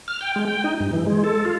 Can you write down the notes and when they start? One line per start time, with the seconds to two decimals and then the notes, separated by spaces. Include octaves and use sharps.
0.08 F6
0.21 G5
0.36 G#3
0.48 G5
0.64 D#4
0.80 G2
0.93 E3
1.07 G#3
1.24 A4
1.45 F4